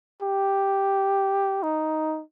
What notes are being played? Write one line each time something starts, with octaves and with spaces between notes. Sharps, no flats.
G4
D#4